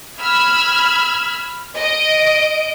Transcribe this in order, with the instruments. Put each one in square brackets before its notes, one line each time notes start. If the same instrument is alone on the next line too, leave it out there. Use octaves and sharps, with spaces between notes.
[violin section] B5 E6 F6 G#6
D#5 D7